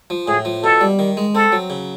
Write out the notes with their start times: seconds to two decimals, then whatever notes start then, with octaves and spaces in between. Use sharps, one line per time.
0.10 F3
0.28 A2 G#4
0.45 F3
0.64 B2 A4
0.81 G3
0.99 D#3
1.17 G#3
1.35 C4 A4
1.52 F#3
1.70 C#3